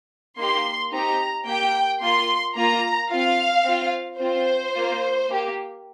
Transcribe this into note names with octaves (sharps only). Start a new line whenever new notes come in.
A#3 D#4 G4 C6
C4 D#4 G4 A#5
A#3 G4 G5
A#3 F4 C6
A#3 F4 A#5
C4 F4 F5
C4 F4
C4 F4 C5
A#3 F4
A#3 G4